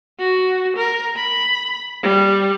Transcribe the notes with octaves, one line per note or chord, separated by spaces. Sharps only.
F#4
A#4
B5
G3